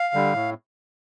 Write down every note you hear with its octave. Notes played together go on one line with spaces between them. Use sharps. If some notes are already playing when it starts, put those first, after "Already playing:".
Already playing: F5
D3 G3
A2